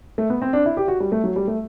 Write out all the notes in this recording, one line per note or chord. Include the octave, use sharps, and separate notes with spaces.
A3
B3
C4
D4
E4
G4
F#4
G3
A3
F#3
G3
A3